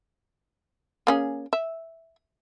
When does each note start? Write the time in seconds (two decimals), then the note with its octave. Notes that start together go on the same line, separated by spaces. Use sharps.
1.07 A#3 C#4 G#4
1.53 E5